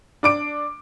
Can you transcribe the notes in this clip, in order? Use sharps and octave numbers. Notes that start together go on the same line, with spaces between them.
D4 D6 D7